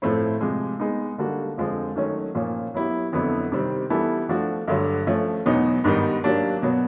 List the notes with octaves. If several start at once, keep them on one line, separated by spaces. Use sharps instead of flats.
A2 F3 A3 C4 E4
C3 F3 G#3
G#3 B3 D#4
D3 G3 A#3 D4 F#4
F2 D3 F3 G#3 C4
D#3 F#3 A3 C#4
A#2 F3 A#3 C#4
F#3 B3 E4 G4
F2 D3 F#3 B3 E4
C3 D#3 G3 C4
E3 G3 B3 E4 A4
F3 A3 D4 F#4
G2 D3 F#3
F3 A3 C#4
E2 B2 F#3 B3 D#4
G#2 D#3 G3 B3 D#4
F#3 A#3 D4 G4
B2 F#3 B3